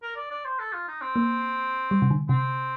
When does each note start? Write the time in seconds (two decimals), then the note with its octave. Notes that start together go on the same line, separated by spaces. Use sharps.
0.02 A#4
0.16 D5
0.30 D5
0.45 C5
0.59 A4
0.73 F4
0.88 D#4
1.01 C4
1.16 A#3
1.91 G3
2.02 C3
2.10 D3
2.29 C3 C4